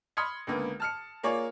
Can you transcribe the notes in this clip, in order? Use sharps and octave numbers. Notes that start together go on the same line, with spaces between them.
B5 C6 D#6 F6 G#6 C#7
C#2 D3 A#3 B3
A5 F6 C#7
A#3 F4 G#4 C#5 D5